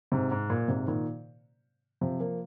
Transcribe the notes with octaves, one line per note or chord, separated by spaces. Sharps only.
G#2 C3
G#2
A#2
G#2 C3
A#2 D#3
C3 F3
F3 A#3